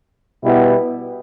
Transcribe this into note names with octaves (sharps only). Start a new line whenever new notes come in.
B2 G3 B3 E4